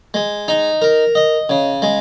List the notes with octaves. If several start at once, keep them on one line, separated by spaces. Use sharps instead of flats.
G#3
D#4
A#4
D#5
C#3
G#3